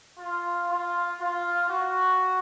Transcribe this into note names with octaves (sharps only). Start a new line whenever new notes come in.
F4
F4
F4
F#4